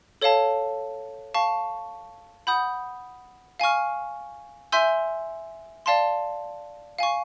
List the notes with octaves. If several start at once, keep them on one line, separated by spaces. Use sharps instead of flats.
A4 C#5 F5 A5
F5 A5 C#6
F#5 B5 D#6 G6
F5 G#5 C#6 F6
E5 G#5 C6 E6 G6
D5 F5 A5 C6
F5 G#5 C#6